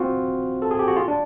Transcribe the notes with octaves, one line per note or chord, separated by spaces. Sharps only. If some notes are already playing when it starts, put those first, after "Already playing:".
Already playing: C4 F4 F#4
A4
G#4
G4
F#4
F4
D4